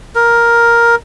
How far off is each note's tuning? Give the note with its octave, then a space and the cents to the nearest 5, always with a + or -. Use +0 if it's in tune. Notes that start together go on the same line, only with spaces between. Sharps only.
A#4 +5